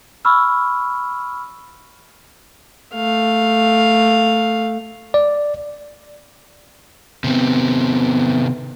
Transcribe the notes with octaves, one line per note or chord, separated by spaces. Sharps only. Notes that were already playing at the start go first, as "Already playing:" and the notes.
B5 C#6 E6 F6
A3 F5
D5
C3 D#3 B3 C4